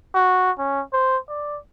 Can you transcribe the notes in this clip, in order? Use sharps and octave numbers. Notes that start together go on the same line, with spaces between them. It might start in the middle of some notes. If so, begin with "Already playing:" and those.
F#4
C#4
C5
D5